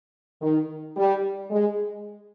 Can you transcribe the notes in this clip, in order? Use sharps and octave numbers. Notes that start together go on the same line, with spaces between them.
D#3
G3
G#3